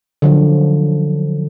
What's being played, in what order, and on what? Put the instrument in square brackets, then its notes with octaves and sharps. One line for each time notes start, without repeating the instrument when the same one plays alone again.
[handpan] D3 F3 F#3